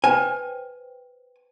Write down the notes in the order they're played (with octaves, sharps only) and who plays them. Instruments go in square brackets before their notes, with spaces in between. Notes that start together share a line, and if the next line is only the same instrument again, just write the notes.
[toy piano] B4 C5 G5 [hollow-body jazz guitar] G#5